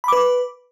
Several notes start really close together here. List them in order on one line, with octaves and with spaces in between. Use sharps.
B5 D6 B4